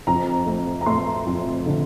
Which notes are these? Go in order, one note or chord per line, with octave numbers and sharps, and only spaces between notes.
F2 A#5
A3
A#5
A3 C6
F2
D3